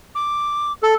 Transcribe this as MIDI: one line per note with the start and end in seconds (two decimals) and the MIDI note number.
0.15 0.72 86
0.83 0.94 69